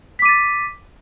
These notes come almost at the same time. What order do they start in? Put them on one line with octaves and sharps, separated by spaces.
B6 D6 D#7 A6